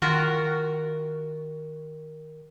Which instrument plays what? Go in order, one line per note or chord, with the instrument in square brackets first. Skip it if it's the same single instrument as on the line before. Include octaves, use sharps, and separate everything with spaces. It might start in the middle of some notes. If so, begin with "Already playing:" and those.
[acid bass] D#3 [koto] F4 F#4 A#4